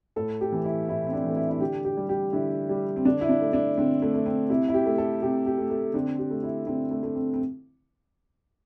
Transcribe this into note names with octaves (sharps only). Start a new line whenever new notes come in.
A2 A4
G4
E3 A3
E4
A2 E4
C4
D4
E3 A3
E4
E4
D3 G4
G4
G3
G4
D3 E4
G3
C4
D3 D4
E4
D4
A3
D4
D3 C4
A3
A3
C4
C3 E4
E4
G4
A3
A4
C3 G4
G4
A3
A3
D3 C4
G4
A3
E4
D3 C4
A3
A3
C4
C4